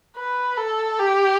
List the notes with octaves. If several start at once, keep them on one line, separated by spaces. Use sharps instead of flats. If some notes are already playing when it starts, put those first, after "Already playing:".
B4
A4
G4